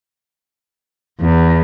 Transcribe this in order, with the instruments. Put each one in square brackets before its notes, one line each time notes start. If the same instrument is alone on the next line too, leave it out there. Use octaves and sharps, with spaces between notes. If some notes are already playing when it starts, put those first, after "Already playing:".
[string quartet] E2